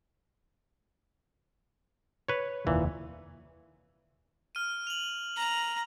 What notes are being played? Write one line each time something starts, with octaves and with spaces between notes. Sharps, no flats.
B4 C#5
F1 D#2 A#2 E3
F6 D#7
F7 F#7
A#5